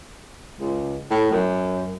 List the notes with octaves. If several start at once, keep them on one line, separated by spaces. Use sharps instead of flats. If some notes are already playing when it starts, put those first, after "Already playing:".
C#2
A2
F#2